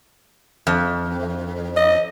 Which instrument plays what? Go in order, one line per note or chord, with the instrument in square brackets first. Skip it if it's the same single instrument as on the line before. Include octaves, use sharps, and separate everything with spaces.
[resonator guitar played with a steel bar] F2
[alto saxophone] D#5